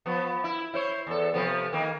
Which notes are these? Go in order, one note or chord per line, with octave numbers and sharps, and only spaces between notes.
F3 B3
E4
E4 C5 C#5
E2 A4
C3 F3 B3
D#3 A#3